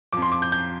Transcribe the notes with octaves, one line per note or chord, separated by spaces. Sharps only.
F2 F3 D6
C6
D6
G6
G6